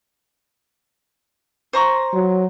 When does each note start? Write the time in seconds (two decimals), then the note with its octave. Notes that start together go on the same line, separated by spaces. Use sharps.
1.73 C5 A#5 C#6
2.14 F#3